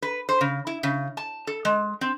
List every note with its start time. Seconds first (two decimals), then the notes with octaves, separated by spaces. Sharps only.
0.02 B4
0.29 C5
0.41 C#3
0.67 E4
0.83 C#3
1.17 A5
1.47 A4
1.65 G#3
2.01 C4